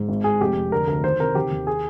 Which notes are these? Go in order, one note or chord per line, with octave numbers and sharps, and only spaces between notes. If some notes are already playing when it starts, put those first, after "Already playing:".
Already playing: G#2
G#1
G#1 G#4
F1 G4
F1
D3 A#4
D2 A#4
D#3 C5
C3 A#4
D#3 G4
D#2
G#4